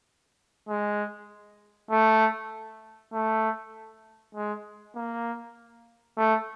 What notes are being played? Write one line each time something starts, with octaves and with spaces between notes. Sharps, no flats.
G#3
A3
A3
G#3
A#3
A3